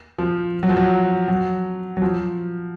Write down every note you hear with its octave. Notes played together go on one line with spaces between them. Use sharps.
F3
F#3
F3
F#3
F#3
F#3
F3